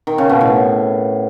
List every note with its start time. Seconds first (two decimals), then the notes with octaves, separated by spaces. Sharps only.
0.07 D#3
0.18 C#3
0.29 B2
0.41 A2